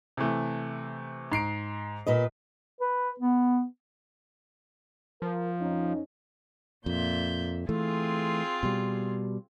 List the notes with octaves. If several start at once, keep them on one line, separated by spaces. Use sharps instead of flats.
C3 E3 A3
G#2 C7 D7
A#2 B4 D#5
B4
B3
F3 A#4
F2 C#4 D#4
F2 A#2 E5 G6
E3 A3 C4 F4 G#4
B2 G3